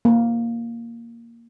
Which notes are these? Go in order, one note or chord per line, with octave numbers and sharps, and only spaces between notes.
A#3